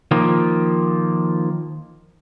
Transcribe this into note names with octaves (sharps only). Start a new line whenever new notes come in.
D#3 F3 A#3